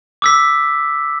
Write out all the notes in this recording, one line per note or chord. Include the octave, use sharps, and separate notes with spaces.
D6 E6 B6